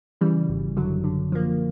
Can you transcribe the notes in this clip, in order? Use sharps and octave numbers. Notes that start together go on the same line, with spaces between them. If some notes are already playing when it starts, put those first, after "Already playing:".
C#3 E3 G3
G#1
F#2 D3 F#3
D3
F3 A#3